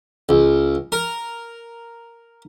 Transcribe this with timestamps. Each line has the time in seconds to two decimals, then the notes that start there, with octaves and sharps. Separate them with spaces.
0.29 C#2
0.92 A#4